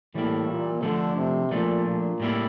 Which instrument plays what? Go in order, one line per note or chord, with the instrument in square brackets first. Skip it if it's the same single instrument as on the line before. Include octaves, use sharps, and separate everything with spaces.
[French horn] A2 [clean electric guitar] E3 G3 A#3 E4
[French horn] A#2
[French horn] D3 [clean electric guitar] F3 A3 D4
[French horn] C3
[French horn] A#2 [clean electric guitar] F3 A3 D4
[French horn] A#2
[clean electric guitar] A2 G3 A#3 E4